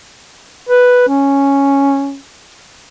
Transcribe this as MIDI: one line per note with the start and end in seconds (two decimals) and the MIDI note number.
0.69 1.06 71
1.08 2.18 61